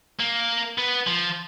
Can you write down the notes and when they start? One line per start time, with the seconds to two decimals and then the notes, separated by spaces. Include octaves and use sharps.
0.19 A#3
0.78 B3
1.07 F3